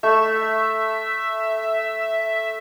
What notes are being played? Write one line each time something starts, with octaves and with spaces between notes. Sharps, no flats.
A3 E5